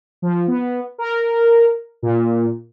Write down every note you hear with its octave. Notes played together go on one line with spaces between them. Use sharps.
F3
B3
A#4
A#2